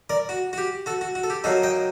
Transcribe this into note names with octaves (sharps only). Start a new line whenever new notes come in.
A#4 D5
F#4
F#4
G4
F#4 A4
F#4
F#4
A4
G4
F#3 A#3 D#4 F#4 A4
D#5 G5